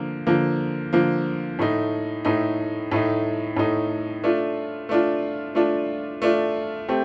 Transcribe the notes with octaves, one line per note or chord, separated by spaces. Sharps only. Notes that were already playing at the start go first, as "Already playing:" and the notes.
Already playing: D3 F3 A#3
D3 F3 A#3
D3 F3 A#3
A2 A3 D#4
A2 A3 D#4
A2 A3 D#4
A2 A3 D#4
A3 D4 F4
A3 D4 F4
A3 D4 F4
A3 D4 F4
A3 C4 G4